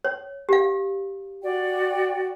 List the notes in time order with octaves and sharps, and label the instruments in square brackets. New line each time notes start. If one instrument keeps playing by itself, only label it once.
[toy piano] C#5
G4 F5
[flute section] F#4 D5 G5